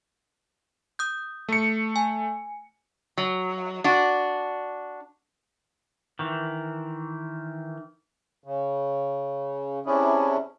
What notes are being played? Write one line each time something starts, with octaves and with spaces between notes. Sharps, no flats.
D#6 G6
A3 C#7
G#5
F#3
D4 F#4
D#3 E3
C#3
C3 C#4 D4 E4 G#4